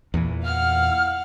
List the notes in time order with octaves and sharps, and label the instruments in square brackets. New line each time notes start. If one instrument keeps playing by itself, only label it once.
[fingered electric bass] E2 A#2 E3
[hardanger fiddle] F5 F#5 [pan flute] F6